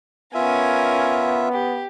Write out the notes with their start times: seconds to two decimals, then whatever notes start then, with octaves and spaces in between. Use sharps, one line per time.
0.35 B3 C#4 F4 A#4 E5 G#5
1.53 G4